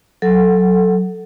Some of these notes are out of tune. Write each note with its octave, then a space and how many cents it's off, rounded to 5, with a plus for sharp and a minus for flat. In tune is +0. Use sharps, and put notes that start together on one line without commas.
F#3 +0 A4 +0 F#5 +15